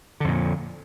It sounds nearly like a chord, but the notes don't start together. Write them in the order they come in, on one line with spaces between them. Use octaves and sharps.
D3 F2 A#2